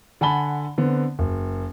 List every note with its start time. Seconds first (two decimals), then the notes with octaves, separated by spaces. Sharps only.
0.21 D3 F#5 G#5 A5 B5 G7
0.78 D3 B3 C4
1.19 F#1